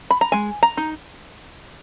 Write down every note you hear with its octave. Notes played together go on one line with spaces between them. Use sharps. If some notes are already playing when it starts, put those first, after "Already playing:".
B5
A#5
G#3 G#5
A#5
D#4